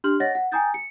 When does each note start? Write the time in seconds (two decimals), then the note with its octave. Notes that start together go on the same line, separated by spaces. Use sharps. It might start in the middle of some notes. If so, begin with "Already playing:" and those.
0.04 D4 G4 C6 F6 F#7
0.20 C#5 D#5 F#5 A6 A#6
0.35 F#5
0.52 G5 G#5 A#5 D#6 G6 A6
0.74 C#7